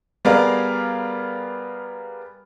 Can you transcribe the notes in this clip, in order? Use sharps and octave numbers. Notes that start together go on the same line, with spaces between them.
G3 B3 G#4 A#4 D5 F5